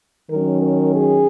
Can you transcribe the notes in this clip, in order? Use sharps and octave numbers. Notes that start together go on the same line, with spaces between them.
D#3 F#3 C#4 A#4
A#4
G#4